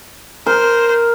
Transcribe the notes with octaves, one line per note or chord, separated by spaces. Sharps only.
A#4 C5